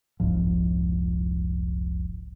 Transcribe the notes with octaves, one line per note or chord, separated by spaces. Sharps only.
F1 C2 G#2 F3